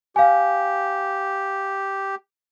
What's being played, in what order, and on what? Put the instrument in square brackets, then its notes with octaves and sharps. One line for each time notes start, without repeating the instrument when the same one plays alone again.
[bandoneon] G4 [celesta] F5 G#5